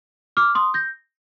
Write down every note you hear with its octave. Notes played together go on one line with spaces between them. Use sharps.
D6 F6
C6 D#6
G6 A#6